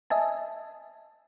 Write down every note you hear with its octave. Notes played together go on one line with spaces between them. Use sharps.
D#5 E5 G#5 A5